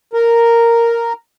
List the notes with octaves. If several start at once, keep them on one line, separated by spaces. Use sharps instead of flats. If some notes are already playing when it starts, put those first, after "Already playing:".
A#4